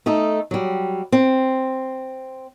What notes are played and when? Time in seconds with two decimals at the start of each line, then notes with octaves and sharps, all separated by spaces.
0.06 A3 D#4 A4
0.51 F#3 G3
1.12 C4